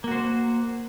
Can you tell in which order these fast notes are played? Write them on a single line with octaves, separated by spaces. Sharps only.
A#3 F#4 C5